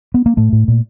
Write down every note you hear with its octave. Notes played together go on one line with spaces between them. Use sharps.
B3
A#3
A2 A3
A2
A#2